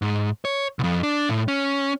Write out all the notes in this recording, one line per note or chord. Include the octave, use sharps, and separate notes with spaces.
G#2
C#5
C2 F2
D4
A2
C#4